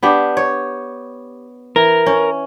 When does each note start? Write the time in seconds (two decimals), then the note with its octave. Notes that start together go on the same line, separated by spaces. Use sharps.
0.03 B3 D4 G4
0.37 C#5
1.76 E3 A#4
2.06 C#4